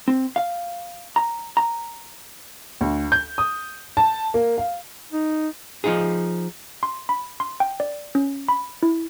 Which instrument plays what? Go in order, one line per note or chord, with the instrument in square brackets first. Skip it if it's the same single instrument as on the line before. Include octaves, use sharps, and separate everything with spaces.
[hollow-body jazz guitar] C4
F5
A#5
A#5
[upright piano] D2
G6
D#6
A5
A#3
F5
[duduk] D#4
[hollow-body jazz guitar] F3 D#4 G#4
[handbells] C6
B5
C6
G5
D5
C#4
B5
E4